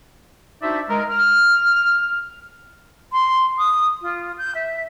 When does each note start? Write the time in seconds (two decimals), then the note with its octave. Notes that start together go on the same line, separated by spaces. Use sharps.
0.62 D4 D#4 F#4 C5 D5 E5
0.89 G#3 A#4
1.10 F6
3.12 C6
3.58 D#6
4.01 F4
4.37 G6
4.54 E5